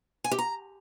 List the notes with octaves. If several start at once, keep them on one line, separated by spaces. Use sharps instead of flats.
G#5
G4
A#5